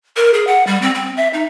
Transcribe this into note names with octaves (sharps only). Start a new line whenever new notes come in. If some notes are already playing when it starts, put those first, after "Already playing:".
A#4
G#4
F#5
G3
C4
C4
E5
D#4